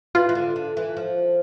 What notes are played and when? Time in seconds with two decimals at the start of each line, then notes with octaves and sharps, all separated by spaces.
0.15 E3 F4
0.29 E3
0.35 D3
0.56 D3
0.77 E3
0.97 F3